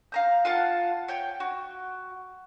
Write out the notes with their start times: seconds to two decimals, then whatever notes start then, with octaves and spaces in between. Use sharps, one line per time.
0.12 F5 A#5 G6
0.45 F4 F5 F#5 A5
1.08 C#5 G5
1.40 F#4